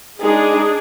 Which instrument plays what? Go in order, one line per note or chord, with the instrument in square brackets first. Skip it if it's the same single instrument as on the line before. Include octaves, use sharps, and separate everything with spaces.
[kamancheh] G#3 D#4 [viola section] D4 G#4